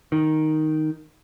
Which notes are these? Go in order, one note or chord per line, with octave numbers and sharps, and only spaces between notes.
D#3